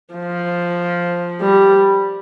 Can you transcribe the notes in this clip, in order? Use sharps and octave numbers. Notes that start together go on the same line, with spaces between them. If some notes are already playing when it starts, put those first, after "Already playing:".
F3
G3